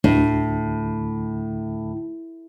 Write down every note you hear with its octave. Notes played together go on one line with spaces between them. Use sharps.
D2 A2 D3